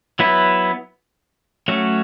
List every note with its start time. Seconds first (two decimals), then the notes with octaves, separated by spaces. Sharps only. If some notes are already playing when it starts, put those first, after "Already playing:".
0.19 F#3 B3 E4 B4
1.68 F#3 A3 C#4 F#4